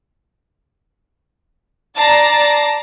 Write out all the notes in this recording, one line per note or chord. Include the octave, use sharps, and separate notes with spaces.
D5 A5 A#5 A6 A#6 C7